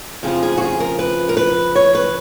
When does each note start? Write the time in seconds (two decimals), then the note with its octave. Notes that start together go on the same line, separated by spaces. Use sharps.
0.23 F2 C#3 F3 G#4
0.43 G#4
0.58 F#4
0.62 G#4
0.80 A#4
0.99 B4
1.29 A#4
1.37 B4
1.75 C#5
1.95 B4